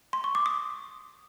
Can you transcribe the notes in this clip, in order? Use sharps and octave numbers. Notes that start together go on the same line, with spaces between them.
C6
C#6
D6
D#6